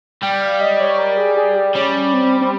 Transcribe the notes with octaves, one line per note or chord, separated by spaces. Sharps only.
G3 G5
F5
D#5
C#5
A#4
G#4
G#4
G4
G3 C#4
C4
C4